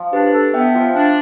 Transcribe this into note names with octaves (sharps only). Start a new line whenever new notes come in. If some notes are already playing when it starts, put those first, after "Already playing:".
Already playing: F3
D4 G4 B4
A4
B3 E5 G5
F3
D4